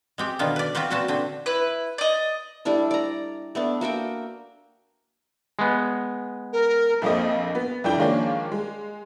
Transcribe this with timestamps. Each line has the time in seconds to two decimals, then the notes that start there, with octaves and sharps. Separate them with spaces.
0.18 G#3 C4 G4
0.39 B2 D3 D#3 B3 F4
0.56 B4 D5
0.75 C4 F4 F#4 B4 C5
0.90 A#2 C4 F#4 B4 A5
1.08 D3 C4
1.46 E4 B4
1.98 D5 D#5
2.65 G3 A3 D4 E4
2.91 D5 A#5
3.55 A3 B3 D4
3.81 A#3 F#4 E5 G5
5.59 G#3 B3
6.52 A#4
7.02 A#1 F2 A#3 C4 D#5
7.55 B3
7.84 F2 D4 E4 G5
7.98 D#3 F3 G#3 A#3 C#4 D4
8.52 G#3